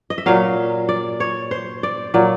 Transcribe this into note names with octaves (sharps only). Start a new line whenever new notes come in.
D#5
E5
A#2 F#3 F5
D5
C#5
C5
D5
A#2 F#3 D5